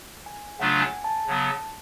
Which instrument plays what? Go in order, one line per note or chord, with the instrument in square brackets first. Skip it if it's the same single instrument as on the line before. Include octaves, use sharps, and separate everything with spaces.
[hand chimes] G#5
[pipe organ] C#3 F#3 A3 D4 F4 [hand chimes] F#5
[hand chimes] G#5
A5
[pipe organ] C#3 F#3 B3